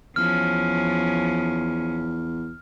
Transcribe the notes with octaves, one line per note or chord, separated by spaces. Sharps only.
E2 F3 C#4 F6